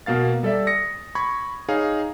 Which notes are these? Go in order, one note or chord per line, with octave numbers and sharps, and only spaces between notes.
B2 A#3 F5 A6
G3 A4 D5 E5
D#6 A#6 C#7
B5 C#6 G#6
D#4 G#4 C#5 F5